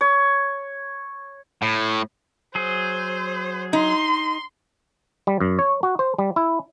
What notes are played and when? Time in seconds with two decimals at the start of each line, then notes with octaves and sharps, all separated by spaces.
0.01 C#5
1.62 A2
2.55 F#3 G#4 C5
3.73 D#4 C6
5.27 G3
5.40 F#2
5.59 C#5
5.83 F#4
5.99 C5
6.18 G3
6.36 E4